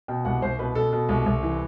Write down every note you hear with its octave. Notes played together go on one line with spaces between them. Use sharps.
B2 G5
C2 F#5
C2 C5
B2 B4
B2 A4
B2
C2
C2
E3